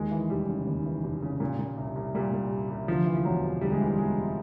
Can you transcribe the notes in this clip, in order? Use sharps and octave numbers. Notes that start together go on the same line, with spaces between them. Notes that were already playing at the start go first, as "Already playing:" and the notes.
Already playing: D#2 G#3
E3
F1 G3
C#3
D#2
E3
F1
C#3
A#2
A#2
C2
C2
A#2 G3
A#2
C2
C2
D2 F3
E3
F3
E1 F#3
C3
D2 G3
G#3
E3 G3
E1 G#3
C3